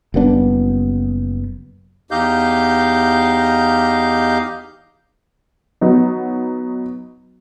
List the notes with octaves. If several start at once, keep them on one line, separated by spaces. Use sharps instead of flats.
F#1 G3 B3 D4
E2 D#4 G4 D#5 F5 G6
F#3 B3 D#4